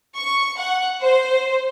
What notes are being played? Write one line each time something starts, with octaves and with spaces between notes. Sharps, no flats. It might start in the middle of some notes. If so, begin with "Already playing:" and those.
C#6
F#5
C5